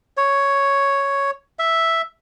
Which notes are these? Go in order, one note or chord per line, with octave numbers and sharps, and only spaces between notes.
C#5
E5